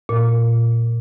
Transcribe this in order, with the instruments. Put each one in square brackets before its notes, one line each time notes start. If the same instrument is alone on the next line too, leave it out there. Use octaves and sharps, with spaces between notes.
[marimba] A#2